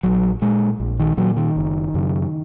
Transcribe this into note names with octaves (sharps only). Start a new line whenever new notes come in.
A#1 F#3
A#2 G#3
A#1
D#3
A#2 F#3
D#3
F#1
F#2 C#3